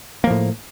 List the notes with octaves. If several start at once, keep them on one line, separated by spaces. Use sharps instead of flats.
A2 F3 A#3